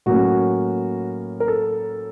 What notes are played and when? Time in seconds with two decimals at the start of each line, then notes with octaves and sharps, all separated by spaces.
0.06 A2 F#3 A#3 C#4 F#4
1.40 A#4
1.48 A4